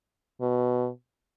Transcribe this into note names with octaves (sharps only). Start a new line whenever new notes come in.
B2